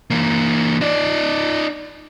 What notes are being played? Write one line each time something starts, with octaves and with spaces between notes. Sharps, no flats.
E3 A#3
D#4 D5